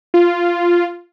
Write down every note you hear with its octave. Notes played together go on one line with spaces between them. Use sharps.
F4